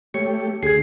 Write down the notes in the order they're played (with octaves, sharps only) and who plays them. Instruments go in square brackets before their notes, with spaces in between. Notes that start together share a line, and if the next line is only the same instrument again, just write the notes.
[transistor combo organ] A3 G4 [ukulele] C#5 [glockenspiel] C#7
[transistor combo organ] D2 [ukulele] G#4 [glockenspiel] G#6 C7